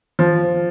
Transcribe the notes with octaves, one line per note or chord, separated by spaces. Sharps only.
F3